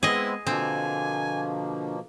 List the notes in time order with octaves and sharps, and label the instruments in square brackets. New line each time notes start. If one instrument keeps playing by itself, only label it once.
[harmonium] G#3 B3 C4 [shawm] E4 [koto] G#4 D#5
[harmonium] B2 F3 A#3 [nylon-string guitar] D3 [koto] C4 [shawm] G#5